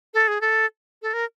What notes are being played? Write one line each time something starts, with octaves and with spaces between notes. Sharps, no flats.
A4
G#4
A4
A4
A#4